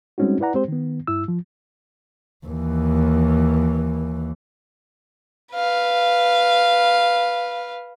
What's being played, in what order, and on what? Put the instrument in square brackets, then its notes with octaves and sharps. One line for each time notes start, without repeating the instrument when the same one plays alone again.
[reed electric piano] G3 G#3 C4 C#4 D#4 F#4
E4 B4 D5 F#5 A#5
G#3 C4 G4 C5
D#3 B3
G2 E4 E6
F3
[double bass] D#2 E3
[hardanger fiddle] B4 F5